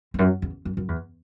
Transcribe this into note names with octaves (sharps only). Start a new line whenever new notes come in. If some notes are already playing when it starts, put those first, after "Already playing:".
E2
F#2
E2
F#2
F#2
E2